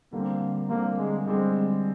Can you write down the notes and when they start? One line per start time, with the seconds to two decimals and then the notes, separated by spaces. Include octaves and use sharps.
0.13 D3 G3 A#3 C4
0.69 D3 G3 A#3 C4
0.97 G#3
1.26 D3 G3 G#3 C4